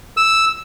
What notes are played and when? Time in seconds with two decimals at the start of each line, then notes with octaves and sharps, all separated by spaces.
0.17 E6